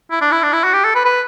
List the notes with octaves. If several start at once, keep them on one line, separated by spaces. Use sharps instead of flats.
E4
D4
E4
D4
E4
F#4
G4
A4
B4
B4